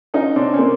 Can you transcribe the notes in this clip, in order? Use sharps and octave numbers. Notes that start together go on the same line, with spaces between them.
C#4 D#4
C4 D4
C#4
A#3 C4